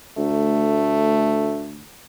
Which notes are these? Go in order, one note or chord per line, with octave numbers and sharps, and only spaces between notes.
D2 A3